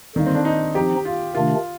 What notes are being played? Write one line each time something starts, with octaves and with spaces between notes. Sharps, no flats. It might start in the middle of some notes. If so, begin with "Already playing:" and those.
D3 D#3 G3 A#3
C4
D4
D#4
F3 C4 D#4 G4
F4
C3 D#3 A3 D4 F4